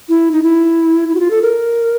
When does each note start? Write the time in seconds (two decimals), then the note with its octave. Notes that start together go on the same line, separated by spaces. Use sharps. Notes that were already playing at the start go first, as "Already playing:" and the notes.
0.09 E4
0.32 D#4
0.43 E4
1.08 E4
1.15 F#4
1.20 F4
1.31 A4
1.42 A#4